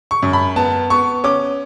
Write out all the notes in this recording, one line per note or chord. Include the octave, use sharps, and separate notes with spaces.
C#6
F#2
B5
B3 A5
B3 C#6
C#4 D6